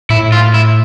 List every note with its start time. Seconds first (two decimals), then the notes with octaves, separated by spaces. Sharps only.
0.10 A2 E4
0.32 F4
0.54 E4